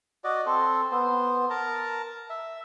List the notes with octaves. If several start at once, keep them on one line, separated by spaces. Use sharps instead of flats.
F#4 D5 D#5
C4 A4 C5
B3 C5
A#4 A5 A#5
E5